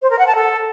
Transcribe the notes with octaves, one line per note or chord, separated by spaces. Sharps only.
C5
A#4
F#5
A5
A4